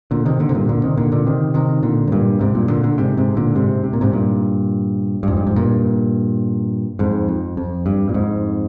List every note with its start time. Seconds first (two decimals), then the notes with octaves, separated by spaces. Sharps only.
0.11 A#2 D3
0.25 C3 D#3
0.39 A#2 D3
0.49 C3
0.54 G2 A#2
0.69 A#2 D3
0.83 C3 D#3
0.97 A#2 D3
1.12 A#2 D3
1.26 C3 D#3
1.54 C3 D#3
1.83 A#2 D3
2.07 G#2
2.12 G2 A#2
2.41 G#2 C3
2.55 G2 A#2
2.69 A#2 D3
2.84 A#2 D3
2.98 G#2 C3
3.17 G#2 C3
3.37 A#2 D3
3.55 G#2 C3
3.84 C3
3.93 A#2
4.01 G#2 C3
4.13 G2 A#2
5.23 G2
5.28 F2 G#2
5.37 G2
5.47 G#2
5.56 G2 A#2
6.99 F2 G#2
7.28 F2
7.57 F2
7.86 G2
8.09 A#2
8.14 F2 G#2